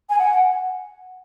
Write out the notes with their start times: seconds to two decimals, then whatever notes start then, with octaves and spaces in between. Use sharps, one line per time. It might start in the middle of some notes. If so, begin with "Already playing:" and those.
0.10 G#5
0.19 F#5